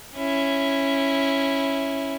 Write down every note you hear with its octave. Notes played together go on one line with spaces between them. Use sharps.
C#4 E4